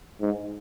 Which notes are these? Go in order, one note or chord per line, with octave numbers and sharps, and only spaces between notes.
G#2